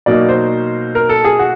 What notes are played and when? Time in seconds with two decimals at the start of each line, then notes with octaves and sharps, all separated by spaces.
0.06 B2 F#3 A#3 D#4 D5
0.29 C5
0.95 A#4
1.09 A4
1.24 G#4
1.39 F#4